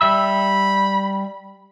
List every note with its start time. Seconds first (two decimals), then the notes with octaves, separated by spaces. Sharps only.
0.01 G3 E5 B5 E6